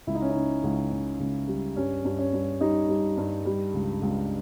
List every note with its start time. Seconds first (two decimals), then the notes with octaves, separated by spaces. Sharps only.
0.07 C#2 E4
0.15 D#4
0.22 C#4
0.30 D#4
0.36 C#3
0.63 C#2
0.92 C#3
1.20 C#2
1.48 G3
1.76 G2 C#4
2.05 G2
2.19 C#4
2.33 G2
2.61 G3 D#4
2.89 G3
3.17 G2
3.45 G3
3.74 C#2
4.02 C#2